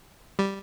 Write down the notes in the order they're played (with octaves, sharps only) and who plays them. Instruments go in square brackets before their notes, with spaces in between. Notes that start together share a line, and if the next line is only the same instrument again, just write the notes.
[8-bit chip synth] G3